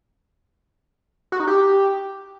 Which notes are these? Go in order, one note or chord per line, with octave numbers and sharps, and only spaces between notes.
F#4
D#4
G4